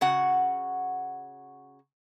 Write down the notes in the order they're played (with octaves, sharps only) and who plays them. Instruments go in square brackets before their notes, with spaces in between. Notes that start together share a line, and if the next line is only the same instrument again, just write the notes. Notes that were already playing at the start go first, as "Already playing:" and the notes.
[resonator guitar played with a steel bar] C#3 F#4 F#5